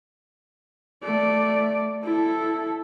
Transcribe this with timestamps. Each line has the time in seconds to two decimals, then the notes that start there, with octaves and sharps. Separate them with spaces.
1.04 A3 D5
2.04 E4 A4